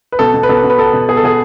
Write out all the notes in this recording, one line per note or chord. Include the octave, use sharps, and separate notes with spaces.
B4
B2 A4
B2
B4
B2 A4
B2
B4
B3 A4
B2
B3 G#4
A4
B2 G#4